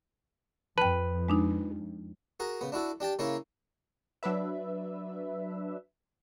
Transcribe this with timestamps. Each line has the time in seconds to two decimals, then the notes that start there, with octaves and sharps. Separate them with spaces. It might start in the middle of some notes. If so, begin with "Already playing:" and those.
0.78 F2 B4 G5 A5
1.28 G#3 D4 D#4
2.40 F#4 G#4 A#4
2.61 C#3 B3
2.72 D4 E4 F#4 A4
3.00 D4 G4 G5 A5
3.19 C#3 A#3 C#4 E4 A#4 C#5
4.23 F#3 D4 B4 E5